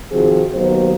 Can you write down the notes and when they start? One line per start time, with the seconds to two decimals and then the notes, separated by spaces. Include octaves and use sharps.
0.12 C3 D#3 F3 C4 F#4 G#4
0.55 D#2 F#3 B3 C5